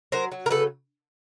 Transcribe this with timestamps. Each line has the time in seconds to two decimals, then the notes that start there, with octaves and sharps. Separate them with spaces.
0.12 F#3 A#4 C5
0.32 F#3
0.46 A#4
0.51 C#3 A4 B4